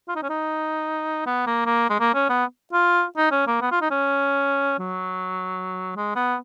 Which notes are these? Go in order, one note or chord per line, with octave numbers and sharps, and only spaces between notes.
F4
D#4
C#4
D#4
B3
A#3
A#3
G#3
A#3
C#4
B3
F4
D#4
C#4
A#3
B3
F4
D#4
C#4
F#3
G#3
B3